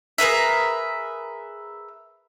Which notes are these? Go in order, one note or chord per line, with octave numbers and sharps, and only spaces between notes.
G#4 A#4 B4 E5